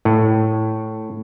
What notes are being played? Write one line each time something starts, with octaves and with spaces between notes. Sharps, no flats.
A2